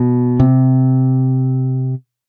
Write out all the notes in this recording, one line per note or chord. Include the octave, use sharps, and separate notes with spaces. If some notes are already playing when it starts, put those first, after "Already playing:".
Already playing: B2
C3